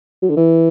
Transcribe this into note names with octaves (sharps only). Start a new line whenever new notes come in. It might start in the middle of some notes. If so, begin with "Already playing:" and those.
F#3
D3
E3